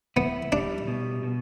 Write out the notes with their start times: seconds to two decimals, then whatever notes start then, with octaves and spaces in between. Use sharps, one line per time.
0.16 B3 E4
0.52 G3 D4
0.87 B2
1.23 B2